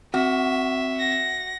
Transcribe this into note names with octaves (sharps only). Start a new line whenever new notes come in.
C4 F#4 E5
F#5 A#6